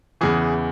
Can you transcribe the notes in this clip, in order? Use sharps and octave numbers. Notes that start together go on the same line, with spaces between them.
E2 C#3 E3 G#4